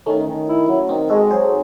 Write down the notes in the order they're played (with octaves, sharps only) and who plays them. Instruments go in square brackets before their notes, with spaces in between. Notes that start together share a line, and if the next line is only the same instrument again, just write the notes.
[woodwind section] D#3 [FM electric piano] A3 C#4
[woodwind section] D#3
E4
F#3
[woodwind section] D#3 [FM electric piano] C4 D#4
[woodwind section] G#3 [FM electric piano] F#4 A4
[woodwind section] F#3 [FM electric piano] G#4 C5